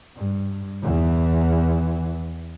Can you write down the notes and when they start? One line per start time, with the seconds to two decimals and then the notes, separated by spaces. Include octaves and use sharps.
0.16 G2
0.83 E2 E3